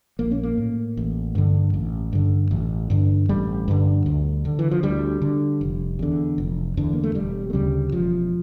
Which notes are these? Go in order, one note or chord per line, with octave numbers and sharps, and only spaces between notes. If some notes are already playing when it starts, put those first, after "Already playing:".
A#1 A#3
C#4
A#3
A2
A1
G2 D3
A1
G2 D3
A1
G2 D3
A1 G3
G2 D3
D2
D3
E3
F3
D2 G3
D3
F1
E2 D3
F1
E2 D3
A#3
A3
E1 G3
A3
D2 C#3 G3
E1 F3